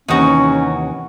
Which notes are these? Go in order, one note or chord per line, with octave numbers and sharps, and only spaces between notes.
D#2 C3 E3 C#4 D#4 F#4